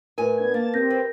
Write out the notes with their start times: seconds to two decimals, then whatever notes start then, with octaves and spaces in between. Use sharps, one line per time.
0.18 A2 A#4 B4 G#5
0.37 B3 D4 G#6
0.54 A#3 A5 A6
0.74 C4 G4 A#4 G6 A#6
0.90 B4